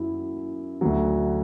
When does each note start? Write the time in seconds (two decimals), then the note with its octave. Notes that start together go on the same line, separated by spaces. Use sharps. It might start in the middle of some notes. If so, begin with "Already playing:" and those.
Already playing: F#2 F#3 E4
0.81 D2 D3 F#3